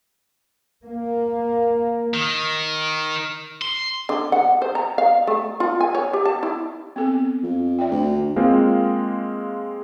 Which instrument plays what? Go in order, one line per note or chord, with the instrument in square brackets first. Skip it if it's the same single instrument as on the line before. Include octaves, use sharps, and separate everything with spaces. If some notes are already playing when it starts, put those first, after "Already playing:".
[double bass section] A#3
[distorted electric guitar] D#3
C6
[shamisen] D3
F#5
C5
A#5
F5
A3
F4
G#5
C#5
G4
A5
E4
[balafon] B3 C4 A4
[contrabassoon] F2
[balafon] D5 E5 G5
[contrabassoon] D2
[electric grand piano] G#3 A#3 C4 F4